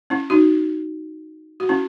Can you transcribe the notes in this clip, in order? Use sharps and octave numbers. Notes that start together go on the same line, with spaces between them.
C#4 E4
D#4 F#4
F#4
C#4 E4